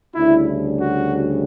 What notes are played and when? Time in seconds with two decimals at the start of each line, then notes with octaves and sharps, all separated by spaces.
0.15 D2 C#3 G3 D4 E4
0.80 F#4